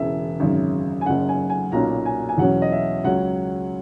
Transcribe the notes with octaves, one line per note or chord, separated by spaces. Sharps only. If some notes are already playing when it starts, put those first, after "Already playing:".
Already playing: E1 E2 C#3 E5
G#1 F#2 C#3
G#5
F#1 F#2 C#3 F#5
G#5
G#5
B1 A#2 F#3 A#3 C#4 A#5
G#5
G#5
E2 B2 F#3 C#4 F#5
D#5
E5
C#2 C#3 F#3 C#4 F#5